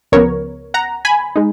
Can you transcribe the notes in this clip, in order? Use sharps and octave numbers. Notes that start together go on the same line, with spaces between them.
C#2 C#3 F3 B3 A#4 C#5
F#5 A#5
G#5 B5
G#3 D#4